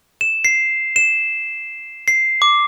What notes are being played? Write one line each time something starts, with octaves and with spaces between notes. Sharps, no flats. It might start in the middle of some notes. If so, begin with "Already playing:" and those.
E7
C7
E7
C7
D6